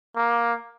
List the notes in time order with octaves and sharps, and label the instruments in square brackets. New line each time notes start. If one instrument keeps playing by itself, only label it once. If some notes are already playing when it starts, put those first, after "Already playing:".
[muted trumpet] A#3